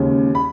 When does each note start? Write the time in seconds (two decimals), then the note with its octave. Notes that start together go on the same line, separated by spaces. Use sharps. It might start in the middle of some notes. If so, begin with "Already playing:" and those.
Already playing: D#2 C#3 G#3
0.35 B5